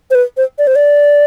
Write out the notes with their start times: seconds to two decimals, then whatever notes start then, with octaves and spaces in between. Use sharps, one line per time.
0.11 C5
0.15 B4
0.37 C5
0.58 D5
0.67 C5
0.76 D5